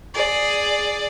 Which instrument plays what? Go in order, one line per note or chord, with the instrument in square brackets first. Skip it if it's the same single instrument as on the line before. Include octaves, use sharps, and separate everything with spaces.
[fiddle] G#4 D5